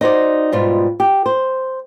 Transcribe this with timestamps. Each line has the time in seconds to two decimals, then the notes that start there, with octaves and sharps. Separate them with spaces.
0.01 D#4 F#4 C5 D5
0.52 G#2 B2 G3 F4
1.00 G4
1.26 C5